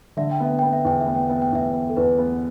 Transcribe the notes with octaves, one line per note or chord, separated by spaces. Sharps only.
D3 E5
G5
B3 E5
B3 G5
E5
E2 G5
E5
B3
G5
B3 E5
G5
E2 E5
B3
A4
E2 B4
B3